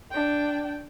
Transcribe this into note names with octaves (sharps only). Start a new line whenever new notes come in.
D4 G5